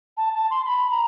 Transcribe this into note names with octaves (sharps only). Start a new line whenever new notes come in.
A5
A5
C6
B5
A#5